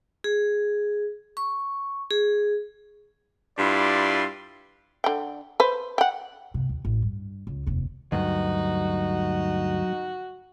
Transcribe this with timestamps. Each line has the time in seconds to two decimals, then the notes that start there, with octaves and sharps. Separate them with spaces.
0.24 G#4
1.37 C#6
2.11 G#4
3.58 G2 E4 F4 D5 C6
5.04 D3 G5
5.60 B4 C5
5.98 F#5 G5
6.54 G2 C3
6.69 D#2
6.85 A1
7.02 G2
7.47 C#2
7.66 F1 D#2
8.12 D2 G2 F#3 D#4 F#4